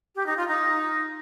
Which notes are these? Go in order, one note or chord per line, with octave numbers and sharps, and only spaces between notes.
G4
D#4
F4
D#4